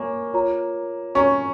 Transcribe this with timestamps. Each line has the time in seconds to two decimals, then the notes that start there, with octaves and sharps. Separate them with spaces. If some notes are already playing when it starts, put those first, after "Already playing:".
Already playing: A#3 C#5 G#5 C#6
0.34 F4 C#5 A#5
1.15 C#4 C#5 A#5 C#6